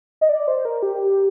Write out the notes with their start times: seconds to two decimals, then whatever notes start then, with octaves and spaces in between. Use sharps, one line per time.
0.21 D#5
0.29 D5
0.48 C5
0.65 A#4
0.83 G4